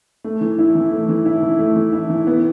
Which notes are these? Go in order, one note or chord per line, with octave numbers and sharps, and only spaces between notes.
A3
E3
E4
E3
A3
E3
E4
E3
A3
E3
E4
E3
B3